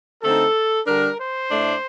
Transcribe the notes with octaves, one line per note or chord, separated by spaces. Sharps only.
D3 A3 C4 D#4 A4
D3 G3 D4 A#4
C5
A2 A3 D4